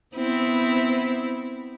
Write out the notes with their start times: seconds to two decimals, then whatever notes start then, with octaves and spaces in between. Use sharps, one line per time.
0.15 B3 C4 E4